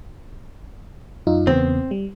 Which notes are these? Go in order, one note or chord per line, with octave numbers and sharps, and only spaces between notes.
F#2 D#4 F4
E2 C#3 B3 C4
G3